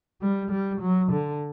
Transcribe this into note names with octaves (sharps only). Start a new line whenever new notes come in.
G3
G3
F#3
D3